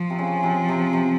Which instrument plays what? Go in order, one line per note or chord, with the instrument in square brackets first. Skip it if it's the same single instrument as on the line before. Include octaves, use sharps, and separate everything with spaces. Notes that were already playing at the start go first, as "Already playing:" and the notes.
Already playing: [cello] F3
[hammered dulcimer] C3
C#3
C3
C3
C3